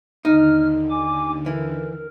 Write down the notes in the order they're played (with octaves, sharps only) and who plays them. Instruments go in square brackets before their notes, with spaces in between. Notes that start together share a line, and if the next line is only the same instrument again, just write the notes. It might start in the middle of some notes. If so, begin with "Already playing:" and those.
[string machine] D#2 D3 [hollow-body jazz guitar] D#4 [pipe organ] F6
[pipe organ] G#5 D6
[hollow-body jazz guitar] E3 [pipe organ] A#4